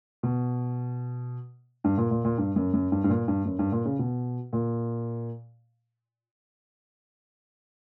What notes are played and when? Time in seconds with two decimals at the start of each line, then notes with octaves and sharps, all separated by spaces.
0.23 B2
1.84 G2
1.97 A#2
2.11 A#2
2.25 A#2
2.38 G2
2.56 F#2
2.73 F#2
2.92 G2
3.04 G2
3.09 A#2
3.28 G2
3.45 F#2
3.59 G2
3.72 A#2
3.85 C#3
3.99 B2
4.53 A#2